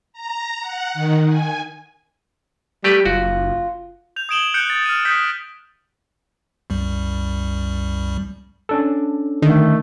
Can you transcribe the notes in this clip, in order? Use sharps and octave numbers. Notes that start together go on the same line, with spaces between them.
A#5
F#5
D#3
G#5
G3 A3 G4 B4
F#1 F4 F#4
G6 F7
D#6 G#6 D7 E7 F#7 G7
F#6 G6 C#7 D7
G6 A6 C#7
F6 D#7
D#6 F6 G6 B6 C#7
C2 F#2 G3
C#4 D4 A4
D3 D#3 A3